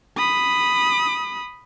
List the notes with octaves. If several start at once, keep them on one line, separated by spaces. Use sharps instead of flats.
B5 D#6